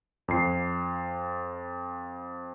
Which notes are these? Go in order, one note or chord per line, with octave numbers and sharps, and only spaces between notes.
F2 C7